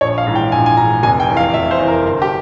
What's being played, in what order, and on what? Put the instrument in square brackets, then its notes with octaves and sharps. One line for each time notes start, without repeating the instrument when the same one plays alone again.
[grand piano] A#1 C#5
F5
G#2 E3
G5
A#1 G#5
G#5
G#2 E3 A#5
F1 G#5
G5
E2 E3
F5
F1 E5
C5
E2 E3
A#4
G1
G4